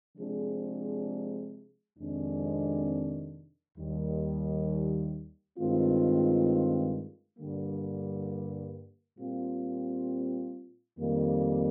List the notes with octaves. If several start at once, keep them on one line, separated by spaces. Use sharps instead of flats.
C3 F3 G#3 D4 G#4
F2 C3 D#3 G#3 D4
D#2 D#3 G3
G2 D#3 G#3 C4 F4
G2 D3 G3 A#3
A#2 G3 C4 F4
F2 D#3 G3 A#3